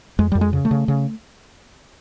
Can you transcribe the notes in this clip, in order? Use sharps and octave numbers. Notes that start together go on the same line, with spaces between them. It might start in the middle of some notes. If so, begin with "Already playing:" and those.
F2 G#3
F2 G3
G#3
C#3
A3
C#3
C#3